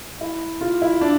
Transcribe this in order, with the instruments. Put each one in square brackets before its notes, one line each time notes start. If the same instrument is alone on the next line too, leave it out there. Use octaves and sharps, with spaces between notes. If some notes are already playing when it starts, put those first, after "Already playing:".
[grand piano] E4
F4
E4
D4